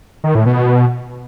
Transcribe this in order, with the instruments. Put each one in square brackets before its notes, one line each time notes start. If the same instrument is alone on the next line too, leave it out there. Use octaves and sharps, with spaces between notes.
[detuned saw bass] D#3
A2
B2